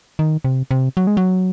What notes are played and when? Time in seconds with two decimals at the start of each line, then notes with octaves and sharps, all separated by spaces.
0.19 D#3
0.45 C3
0.71 C3
0.97 F#3
1.07 G#3
1.17 F#3